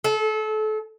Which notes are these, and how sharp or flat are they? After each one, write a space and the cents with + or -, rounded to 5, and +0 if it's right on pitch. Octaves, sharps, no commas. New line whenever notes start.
A4 -30